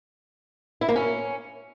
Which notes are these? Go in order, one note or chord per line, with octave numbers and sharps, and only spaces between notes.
E4
A#3
C#4